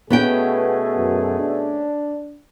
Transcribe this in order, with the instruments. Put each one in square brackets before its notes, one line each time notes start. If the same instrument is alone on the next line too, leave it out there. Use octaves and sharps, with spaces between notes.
[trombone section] B2 A3 G#4 [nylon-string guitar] B3 C#4 G5
[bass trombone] F#2
D4